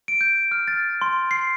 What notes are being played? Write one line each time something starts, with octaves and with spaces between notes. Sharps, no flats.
D7
G6
F6
A6
C6
C7